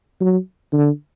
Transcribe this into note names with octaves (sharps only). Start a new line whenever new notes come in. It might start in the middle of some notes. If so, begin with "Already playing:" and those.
F#3
D3